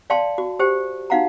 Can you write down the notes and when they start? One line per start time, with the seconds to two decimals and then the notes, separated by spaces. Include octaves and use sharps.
0.10 D5 F5 G5 A5 C6
0.38 F#4
0.59 G4 C5 G5
1.10 D#4 F#4 F5 F#5 A#5